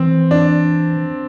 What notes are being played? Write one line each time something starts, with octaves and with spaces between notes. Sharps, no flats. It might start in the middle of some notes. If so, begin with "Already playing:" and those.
Already playing: E3 C4
D4